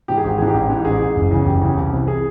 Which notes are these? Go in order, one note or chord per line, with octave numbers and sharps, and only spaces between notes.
G#2 E3 G4
G#4
G#1 G4
G#2 E3 G#4
G4
A1
G#2 E3
A1 G#4
G#2 E3
F#1
E2 C#3
F#1 G4
E2 C#3
C2
C3 E3
G#4